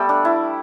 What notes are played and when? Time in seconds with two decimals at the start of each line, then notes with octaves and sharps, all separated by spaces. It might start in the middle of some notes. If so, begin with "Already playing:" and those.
Already playing: G3 A3 B3 G4 A4
0.09 D4
0.25 E4